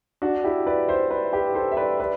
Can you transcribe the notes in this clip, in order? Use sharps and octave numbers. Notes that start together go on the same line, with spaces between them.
D4 F#4
E4 G4
B4 D5
C5 E5
B4 D5
G4 B4
A4 C5
E5
B4 D5
B4 D5